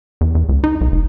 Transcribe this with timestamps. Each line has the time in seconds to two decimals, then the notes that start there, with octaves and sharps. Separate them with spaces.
0.21 E2
0.35 E2
0.49 C#2
0.64 D#4
0.81 B1
0.92 F1